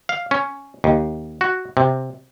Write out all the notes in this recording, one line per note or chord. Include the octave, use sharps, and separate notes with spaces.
F5
C#4
D#2
F#4
C3